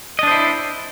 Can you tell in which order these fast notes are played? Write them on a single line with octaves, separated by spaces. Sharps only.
D#5 D4 C5 E4